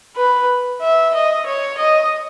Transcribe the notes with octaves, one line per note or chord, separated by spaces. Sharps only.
B4
E5
D#5
C#5
D#5